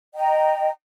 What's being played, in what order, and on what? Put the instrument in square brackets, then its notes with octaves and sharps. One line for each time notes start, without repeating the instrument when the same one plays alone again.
[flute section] D#5 G5 A#5